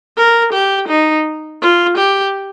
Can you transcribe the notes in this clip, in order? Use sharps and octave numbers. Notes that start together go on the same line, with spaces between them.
A#4
G4
D#4
F4
G4